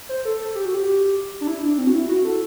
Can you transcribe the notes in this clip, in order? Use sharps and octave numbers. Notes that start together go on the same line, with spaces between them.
C5
A4
A4
G4
F#4
G4
D4
E4
D4
C4
F#4
E4
F#4
A4